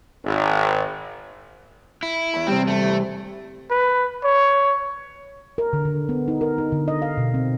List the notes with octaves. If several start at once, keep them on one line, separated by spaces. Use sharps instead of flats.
G#1
E4
E2 B5
C3 G3 C4
A3
E3
B4
C#5
A#4
D3
D3
B3
D#4
A#4
D#4
D3
D#5
F5
B2
C4